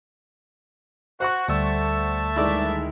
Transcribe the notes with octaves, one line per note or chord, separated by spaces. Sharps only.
F#4 C5 F#5 C#6
D2 G3 A3 E5 A5
G2 D#3 G#3 E4 D5 B5